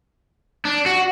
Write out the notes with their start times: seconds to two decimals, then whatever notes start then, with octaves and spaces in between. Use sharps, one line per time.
0.65 D4
0.86 F#4